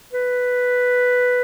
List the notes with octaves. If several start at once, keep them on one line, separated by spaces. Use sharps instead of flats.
B4